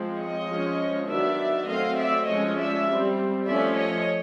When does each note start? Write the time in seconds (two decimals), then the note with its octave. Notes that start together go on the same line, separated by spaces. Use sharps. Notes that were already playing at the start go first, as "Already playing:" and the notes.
Already playing: F3 G#3 C4
0.18 C#5 D#5
0.48 F3 G#3 C#4
1.07 D#3 F#3 B3 D4 D5 E5
1.67 F#3 A3 C4 D#5 F5
1.97 D5 E5
2.27 F3 G#3 C#4 C#5 D#5
2.57 D5 E5
2.87 G3 C4
3.46 F3 A3 C#4 D5 E5
3.76 C#5 D#5